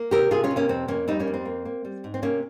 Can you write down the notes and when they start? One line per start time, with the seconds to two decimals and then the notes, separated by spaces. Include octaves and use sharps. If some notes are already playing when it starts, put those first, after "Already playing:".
Already playing: A#3
0.11 C3 G4 A#4
0.31 C3 F4 G#4
0.44 C#4 F4
0.51 C3
0.56 A#3 C#4
0.69 F2 C4
0.88 F2 A#3 C#4
1.08 G3 C4 D#4
1.19 A#3 C#4
1.27 F2
1.34 C4
1.45 A#3
1.65 A#3
1.85 G3
2.04 G#2
2.14 C4
2.22 C3 A#3 C#4